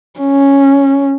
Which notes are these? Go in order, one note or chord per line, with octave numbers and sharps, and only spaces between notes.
C#4